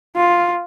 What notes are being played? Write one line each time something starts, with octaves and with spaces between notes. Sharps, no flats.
F4